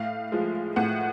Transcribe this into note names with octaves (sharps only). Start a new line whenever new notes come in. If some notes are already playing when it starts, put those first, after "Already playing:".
Already playing: A2 F5
F3 G#3
A2 F#5